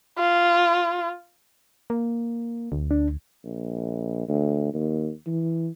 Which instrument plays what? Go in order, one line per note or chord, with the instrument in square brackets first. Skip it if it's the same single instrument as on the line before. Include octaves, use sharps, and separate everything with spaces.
[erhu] F4
[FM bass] A#3
D2
[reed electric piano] D4
[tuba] A#1
D2
D#2
E3